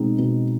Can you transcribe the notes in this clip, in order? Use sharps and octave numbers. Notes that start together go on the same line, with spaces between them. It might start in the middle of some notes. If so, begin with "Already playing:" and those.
Already playing: B2 G#3 C4 D#4
B2